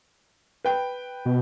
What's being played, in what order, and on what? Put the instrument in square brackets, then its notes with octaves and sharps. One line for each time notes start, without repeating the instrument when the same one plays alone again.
[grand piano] B4 G5
[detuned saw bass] B2